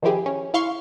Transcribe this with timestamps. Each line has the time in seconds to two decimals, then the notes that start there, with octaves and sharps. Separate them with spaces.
0.02 D#3 F3 C4 E4 G4 G#4
0.26 C#4
0.54 E4 F5 C6 C#6